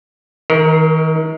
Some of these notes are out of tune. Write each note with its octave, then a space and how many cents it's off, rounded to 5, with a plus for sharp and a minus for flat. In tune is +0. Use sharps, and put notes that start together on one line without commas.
D#3 +40 A#4 +0